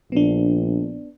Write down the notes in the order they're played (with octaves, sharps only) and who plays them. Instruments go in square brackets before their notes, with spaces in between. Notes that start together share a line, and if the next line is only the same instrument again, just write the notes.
[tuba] A#1 [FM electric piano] B3 D4